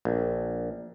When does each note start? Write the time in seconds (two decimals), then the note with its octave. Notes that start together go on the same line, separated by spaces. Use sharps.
0.05 A#1